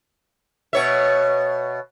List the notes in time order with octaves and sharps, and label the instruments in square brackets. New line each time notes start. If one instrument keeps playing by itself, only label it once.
[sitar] B2 C#5 E5